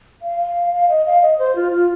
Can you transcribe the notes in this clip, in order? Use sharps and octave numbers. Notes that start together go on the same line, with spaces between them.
F5
F5
D#5
F5
D#5
C5
F4
F4